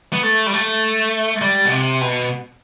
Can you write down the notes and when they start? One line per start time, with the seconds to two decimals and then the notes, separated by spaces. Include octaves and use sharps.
0.13 B3
0.23 A3
0.47 G3
0.53 A3
1.42 G3
1.65 B2
1.71 C3
2.01 B2